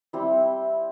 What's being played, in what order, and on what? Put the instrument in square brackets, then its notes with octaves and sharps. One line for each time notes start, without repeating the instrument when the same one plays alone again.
[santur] G3 C4 E4